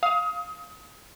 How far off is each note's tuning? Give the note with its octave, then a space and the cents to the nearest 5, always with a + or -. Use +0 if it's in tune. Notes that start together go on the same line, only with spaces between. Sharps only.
F5 +0 D#6 +30